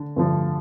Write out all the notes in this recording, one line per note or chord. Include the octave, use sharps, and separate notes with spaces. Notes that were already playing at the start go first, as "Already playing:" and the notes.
Already playing: D3
G2 D3 F3